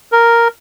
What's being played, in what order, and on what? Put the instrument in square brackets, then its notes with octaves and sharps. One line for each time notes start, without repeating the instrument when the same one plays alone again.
[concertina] A#4